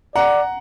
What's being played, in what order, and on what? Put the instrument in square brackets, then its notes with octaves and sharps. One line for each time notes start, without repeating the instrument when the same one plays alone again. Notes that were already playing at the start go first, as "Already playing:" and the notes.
[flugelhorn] D5 [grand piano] F#5 A#5